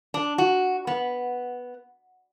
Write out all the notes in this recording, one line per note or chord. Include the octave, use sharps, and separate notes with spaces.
D4
F#4
B3